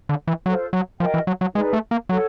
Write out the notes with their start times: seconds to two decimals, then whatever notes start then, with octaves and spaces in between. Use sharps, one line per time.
0.09 D3
0.27 E3
0.46 F#3 F4 A4 C5
0.73 F#3
1.00 F3 F#4 A#4 D#5 G5
1.14 E3
1.27 F#3
1.41 F#3
1.54 G#3 D#4 G#4 B4 D5
1.73 A3
1.91 A#3
2.09 F#3 A4 C#5 F#5